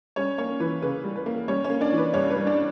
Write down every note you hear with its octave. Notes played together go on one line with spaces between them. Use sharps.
G3 C#4 C#5
A#3 C#4 C#5
E3 B4
C#3 B4
G3
B4
A#3
G3 C#4 C#5
C#4 C#5
A#3
D4 D5
E3
B4
G2 C#4 C#5
B4
G3
D4 D5